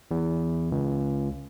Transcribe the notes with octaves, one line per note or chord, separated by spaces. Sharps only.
E2
C#2